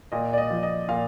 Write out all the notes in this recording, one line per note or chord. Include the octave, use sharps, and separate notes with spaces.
A#2 D#5
D5
D#5
F3
D#5
A#2 F5